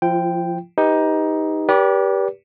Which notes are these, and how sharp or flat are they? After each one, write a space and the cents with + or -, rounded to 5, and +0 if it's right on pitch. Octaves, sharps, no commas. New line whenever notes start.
F3 +0 F4 -45 G5 +0
D#4 +15 G4 +20 B4 +0
G4 +0 B4 -40 D5 -40